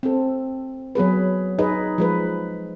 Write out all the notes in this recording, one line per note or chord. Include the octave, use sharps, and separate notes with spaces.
C4 A4
F#3 B3 G#4 B4
D#4 G#4 B4 D#5
F3 G#3 B4